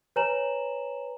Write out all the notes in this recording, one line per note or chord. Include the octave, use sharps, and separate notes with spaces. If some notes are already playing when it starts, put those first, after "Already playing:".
B4 C#5 G#5 A#5 E7 F#7